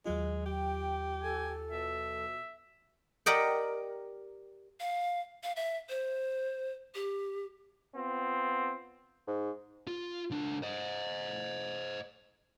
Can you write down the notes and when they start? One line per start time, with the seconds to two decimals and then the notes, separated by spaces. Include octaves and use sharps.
0.06 D#2 F#3 G#3 F4
0.46 G4 G5
1.23 A4 G#5
1.71 B2 E5
3.26 G4 A#4 D5 D#5 F#5 G5
4.80 F5
5.44 F5
5.56 E5
5.89 C5
6.95 G4
7.96 B3 C4 F4
9.27 G#2
9.87 F4
10.30 C#2 D4
10.63 C5 D#5